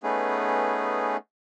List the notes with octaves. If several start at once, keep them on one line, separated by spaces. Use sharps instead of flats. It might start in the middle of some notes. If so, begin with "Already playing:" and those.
A3 B3 C#4 D#4 G#4 B4